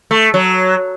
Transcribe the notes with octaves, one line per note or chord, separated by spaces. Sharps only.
A3
F#3